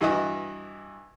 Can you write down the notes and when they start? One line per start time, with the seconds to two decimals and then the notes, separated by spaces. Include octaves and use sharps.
0.01 G2 E3 F#4 D#5 E5 D#6